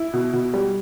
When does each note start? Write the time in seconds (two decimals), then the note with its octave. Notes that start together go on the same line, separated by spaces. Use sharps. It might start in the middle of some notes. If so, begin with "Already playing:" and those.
Already playing: E4
0.13 B2
0.33 B2
0.54 G3